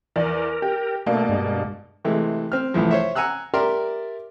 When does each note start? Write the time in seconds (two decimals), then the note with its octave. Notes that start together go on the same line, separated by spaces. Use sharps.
0.16 E2 A#4 D5
0.62 G4
1.06 B2 A3 A#3 D4
1.29 G2 G#3
2.05 C3 E3 G#3 A3
2.52 C4 F6
2.74 C2 A2 E3 F3
2.91 C5 C#5 E5
3.15 F#5 G#5 A#5 E6 F#6
3.54 G4 A#4 D5 E5 A#5 C6